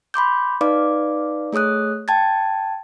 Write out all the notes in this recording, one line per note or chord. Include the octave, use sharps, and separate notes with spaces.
B5 C6 D6 G6
D#4 B4 D5 F5 D6
A3 G#4 C#5 D#6 F#6
G5 A5 G#6 A6